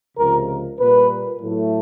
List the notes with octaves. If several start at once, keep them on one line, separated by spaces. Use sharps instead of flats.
C#2 C3 F3 A#4
A#2 G3 A#3 B4
A2 F#3 A3